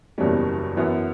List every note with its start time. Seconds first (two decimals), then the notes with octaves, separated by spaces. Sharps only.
0.18 F#1 E2 B2 G3 C#4
0.77 F#2 E3 B3